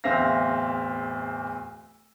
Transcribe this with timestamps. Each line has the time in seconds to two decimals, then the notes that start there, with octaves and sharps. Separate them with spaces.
0.04 D1 E2 C4 E5 F5 A#6